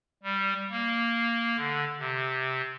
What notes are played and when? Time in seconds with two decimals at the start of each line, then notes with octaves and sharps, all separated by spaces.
0.23 G3
0.70 A#3
1.57 D3
1.99 C3